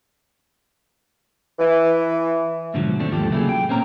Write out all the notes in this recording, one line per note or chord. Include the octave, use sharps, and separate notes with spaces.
E3
G#2 B2 D3 F3 F#3
D#3 A3 C4 D4
D#2 G#2 F3 G4 A4
C#3 F#3 A3 A#3 E4 G#4
G5
A#2 A#3 C4 C#4 A#5